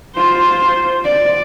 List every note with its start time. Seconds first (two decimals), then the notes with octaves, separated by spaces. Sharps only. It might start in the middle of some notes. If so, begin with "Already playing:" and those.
0.15 F4 C5
1.04 D5